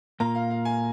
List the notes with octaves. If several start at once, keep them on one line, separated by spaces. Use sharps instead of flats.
A#2 A#3 F4 A#5
F5
F5
G#5